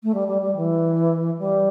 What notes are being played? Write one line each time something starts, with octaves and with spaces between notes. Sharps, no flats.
A3
G3
G3
G3
E3
G3